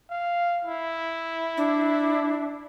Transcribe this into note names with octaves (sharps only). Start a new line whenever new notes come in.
F5
E4
D4